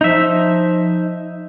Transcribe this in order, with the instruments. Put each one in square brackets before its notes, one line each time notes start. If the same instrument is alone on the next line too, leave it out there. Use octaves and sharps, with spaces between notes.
[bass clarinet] F3 [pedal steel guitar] D#4 E5